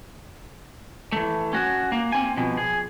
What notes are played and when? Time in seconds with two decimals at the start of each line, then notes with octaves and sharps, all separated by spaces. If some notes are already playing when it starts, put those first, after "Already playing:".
1.12 E3 A3
1.53 C#4 F#4
1.92 A#3
2.12 C4 G#5
2.37 B2 F3
2.57 G#4